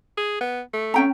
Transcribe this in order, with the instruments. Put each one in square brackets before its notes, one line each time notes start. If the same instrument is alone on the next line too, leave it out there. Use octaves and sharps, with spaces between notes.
[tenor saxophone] G#4
B3
A3
[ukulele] C#4 G5 A#5